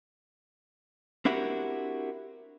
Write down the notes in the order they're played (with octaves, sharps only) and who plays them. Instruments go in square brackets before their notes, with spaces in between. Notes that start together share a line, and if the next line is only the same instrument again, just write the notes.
[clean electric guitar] C4 D4 E4 F#4 G4 A#4